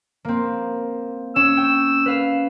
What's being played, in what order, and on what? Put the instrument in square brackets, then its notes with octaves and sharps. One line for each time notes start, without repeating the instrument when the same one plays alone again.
[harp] A#3 C4
[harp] C#4 [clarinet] E6
[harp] G5
B4 F5